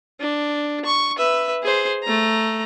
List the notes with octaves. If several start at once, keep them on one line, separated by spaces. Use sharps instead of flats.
D4
C#6
B4 E5
G#4 C5
A3 A#5